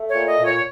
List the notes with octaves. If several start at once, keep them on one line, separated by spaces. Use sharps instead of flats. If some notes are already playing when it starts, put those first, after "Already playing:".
Already playing: A3
C#5
A#2
D#5
A#2
C#5